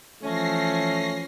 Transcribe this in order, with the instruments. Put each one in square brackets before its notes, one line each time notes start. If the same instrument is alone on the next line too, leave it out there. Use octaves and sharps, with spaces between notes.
[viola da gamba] E3 F3 [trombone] A3 [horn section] C#4 [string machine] A#6 C7